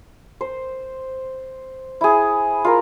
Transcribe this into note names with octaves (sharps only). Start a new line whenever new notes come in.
C5
E4 G#4
F4 A#4